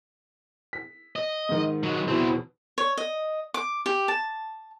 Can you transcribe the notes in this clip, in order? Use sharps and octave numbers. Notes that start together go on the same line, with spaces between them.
B6
D#5
G#2 D#3
F#3 G#3
E2 B2 C4 E4
C#5
D#5
D6
G4
A5